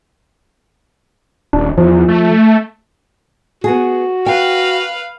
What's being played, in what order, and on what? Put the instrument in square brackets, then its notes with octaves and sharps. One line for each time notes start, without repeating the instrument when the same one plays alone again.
[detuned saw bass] D#1 [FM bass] D4
[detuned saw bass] E2 [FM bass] F3
[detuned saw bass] A3
[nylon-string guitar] B3 G#4 [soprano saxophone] F#4
[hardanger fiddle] B4 F5 [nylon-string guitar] G5